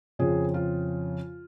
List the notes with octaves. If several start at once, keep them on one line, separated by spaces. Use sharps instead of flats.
F2 C#3 F3 G#4
F4